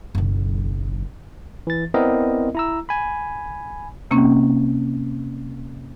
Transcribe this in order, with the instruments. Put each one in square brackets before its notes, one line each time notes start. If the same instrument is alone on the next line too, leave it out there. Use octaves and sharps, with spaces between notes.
[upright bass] F#1 B1
[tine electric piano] E3 A6
B3 C4 E4 A#4 D5 D#5
E4 A#5 E6
G#5 B5
[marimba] C3 A#3 C4 C#4